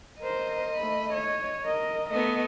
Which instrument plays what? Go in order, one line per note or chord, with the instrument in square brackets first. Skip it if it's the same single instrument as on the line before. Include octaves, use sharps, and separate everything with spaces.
[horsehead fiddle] A#4 C5 [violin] D#5
[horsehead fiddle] A3 B5
C#5
A#4 D#5
[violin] A3 B3 [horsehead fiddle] D#5